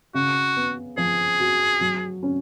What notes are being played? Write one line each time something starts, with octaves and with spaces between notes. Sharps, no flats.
C#3 F#4
B3
F3 G#4
F#4
F#3
C#4